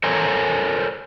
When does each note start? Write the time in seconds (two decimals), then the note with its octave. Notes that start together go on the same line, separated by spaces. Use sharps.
0.04 A4 A#4 C5 C#5 G#5